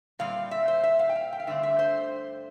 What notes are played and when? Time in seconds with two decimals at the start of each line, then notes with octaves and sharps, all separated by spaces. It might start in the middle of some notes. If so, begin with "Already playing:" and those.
0.19 A#2 G3 C4 F5
0.51 E5
0.68 C5
0.84 E5
0.99 F5
1.09 G5
1.16 F5
1.33 G5
1.40 F5
1.47 G2 D3 A3 C4 E5
1.63 E5
1.79 C5